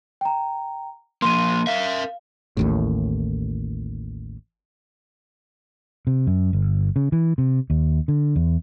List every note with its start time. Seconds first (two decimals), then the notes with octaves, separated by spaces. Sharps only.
0.21 G5 A#5
1.22 F3 A#3 C6 D#7
1.67 A#4 E5 F5
2.57 A1 D#2 A2
6.07 C3
6.27 F#2
6.53 G1
6.96 C#3
7.12 E3
7.38 C3
7.70 D#2
8.08 D3
8.36 E2